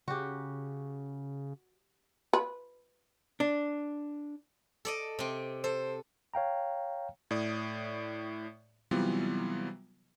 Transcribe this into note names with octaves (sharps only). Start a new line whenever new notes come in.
C#3 F#4 G4
B4
D4
A4 D5 D#5
C3 C4
A4 C5
C#5 F5 G5 A#5
A2 D5 D#6
C3 E3 F#3 G3 B3 F4